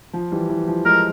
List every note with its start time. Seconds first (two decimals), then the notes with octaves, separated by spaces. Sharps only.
0.13 F3
0.31 E3 G3
0.49 E3
0.67 F3
0.85 F3 G#3 A#4